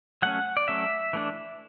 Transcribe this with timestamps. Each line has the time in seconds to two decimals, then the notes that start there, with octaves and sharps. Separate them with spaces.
0.22 F#3 A3 C#4 F#5
0.57 D5
0.68 F#3 A3 C#4 E5
1.13 E3 A3 D4